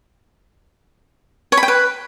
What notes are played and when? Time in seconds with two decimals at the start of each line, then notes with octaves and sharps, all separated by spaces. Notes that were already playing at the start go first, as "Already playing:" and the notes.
1.52 C#5
1.57 B5
1.63 G5
1.68 B4